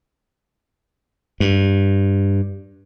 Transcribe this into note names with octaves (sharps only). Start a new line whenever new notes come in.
G2